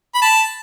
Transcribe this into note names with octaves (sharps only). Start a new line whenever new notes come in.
B5
A5